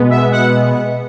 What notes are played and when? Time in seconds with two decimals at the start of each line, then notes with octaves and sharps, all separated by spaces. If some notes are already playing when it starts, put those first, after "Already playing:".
Already playing: B2 G#3 B3
0.10 E5
0.32 F#5